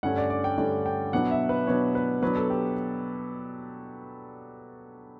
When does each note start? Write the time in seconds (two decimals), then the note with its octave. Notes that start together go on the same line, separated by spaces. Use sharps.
0.03 G2 D3 A3 C#4 F#5
0.18 D5
0.30 D5
0.44 G5
0.58 G2 D3 A3 C#4
0.86 G5
1.13 B2 F#3 B3 D4 F#5
1.31 E5
1.49 B4
1.67 B2 F#3 B3 D4 C#5
1.95 B4
2.22 B2 F#3 B3 D4 B4
2.36 A4
2.50 G4